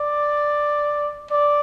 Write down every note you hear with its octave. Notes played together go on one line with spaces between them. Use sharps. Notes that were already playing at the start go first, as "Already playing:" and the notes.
Already playing: D5
D5